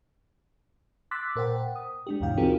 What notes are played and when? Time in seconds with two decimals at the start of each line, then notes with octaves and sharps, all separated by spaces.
1.11 C6 D6 E6 F#6 A6 B6
1.36 A#2 A#4 C5 F#5 G5
1.76 D#6
2.07 G#3 D4 G4
2.21 D2 G2 B2 E3 F5 G5
2.37 C4 D#4 F4 F#4 G#4 A#4